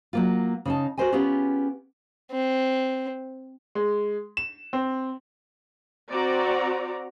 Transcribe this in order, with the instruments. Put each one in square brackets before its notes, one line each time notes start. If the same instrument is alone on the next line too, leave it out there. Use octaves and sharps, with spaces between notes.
[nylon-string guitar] F#3 A#3 F4
C#3 D#4 A5
F#4 G4 A#4 C5 D#5 G#5
B3 C#4 F4 G4 G#4
[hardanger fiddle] C4
[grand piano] G#3
E7
C4
[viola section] C4 F#4 D5 A#5